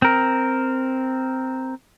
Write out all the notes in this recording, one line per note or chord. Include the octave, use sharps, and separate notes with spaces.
C4 A#4